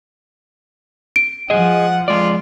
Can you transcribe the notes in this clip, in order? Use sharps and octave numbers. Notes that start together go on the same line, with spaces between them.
D7
F3 G#4 D#5 F#5
F2 G#3 F4 D5